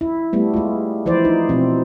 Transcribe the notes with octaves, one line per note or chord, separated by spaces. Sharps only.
E4
G3 A3 B3
G#3 F4
E3 F3 E4 C5 D5
D#4
B2 F3 C4